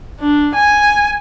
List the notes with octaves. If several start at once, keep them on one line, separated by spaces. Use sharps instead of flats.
D4
G#5